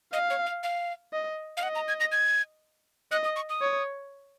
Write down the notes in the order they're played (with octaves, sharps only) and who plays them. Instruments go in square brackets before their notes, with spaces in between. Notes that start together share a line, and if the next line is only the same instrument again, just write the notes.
[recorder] D#5 [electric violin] F5
[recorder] C#5
F5
F5
[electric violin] D#5
[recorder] F5
[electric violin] D#5 [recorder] F#5
[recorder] A#5
G#6
A#6
G#6
[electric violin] D#5 [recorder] F#6
[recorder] D#6
C#6
D#6
[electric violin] C#5